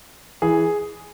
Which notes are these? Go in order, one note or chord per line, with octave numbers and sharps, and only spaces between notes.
E3 G#4